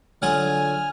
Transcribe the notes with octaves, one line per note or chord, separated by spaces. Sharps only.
D3 F#3 F4 G#4 G#5 F6